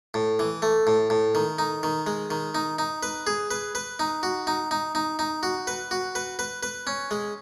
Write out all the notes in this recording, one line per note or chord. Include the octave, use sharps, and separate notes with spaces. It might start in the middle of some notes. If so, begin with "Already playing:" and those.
A2
E3
A3
A2
A2
D#3
D#4
D#3
G#3
D#3
D#4
D#4
B4
G#4
B4
B4
D#4
F#4
D#4
D#4
D#4
D#4
F#4
B4
F#4
B4
B4
B4
C#4
G#3